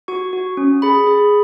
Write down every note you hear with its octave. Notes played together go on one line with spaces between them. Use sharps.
F#4 C#6
F#4
C#4
G#4 B5
G#4